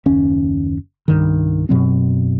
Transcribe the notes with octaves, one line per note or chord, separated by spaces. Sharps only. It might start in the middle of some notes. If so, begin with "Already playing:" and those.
F#1 D#2 C#4
C2 G2 D#3
F#2 B2 F#3 C4